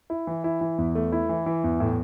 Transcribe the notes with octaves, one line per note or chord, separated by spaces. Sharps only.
E4
E3
E4
E3
E2
A3
E4
E3
E3
E2
A2